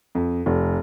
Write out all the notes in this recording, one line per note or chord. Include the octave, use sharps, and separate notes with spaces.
F2
F1